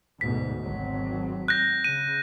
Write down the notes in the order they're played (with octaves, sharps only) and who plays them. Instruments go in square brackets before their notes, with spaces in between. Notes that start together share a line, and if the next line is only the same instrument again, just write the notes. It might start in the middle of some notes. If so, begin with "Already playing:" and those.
[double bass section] D2 G#2 B2 [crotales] B6
[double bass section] G#1 F#3 C4
[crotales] F#6 G6 A#6
[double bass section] C#3 [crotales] D#7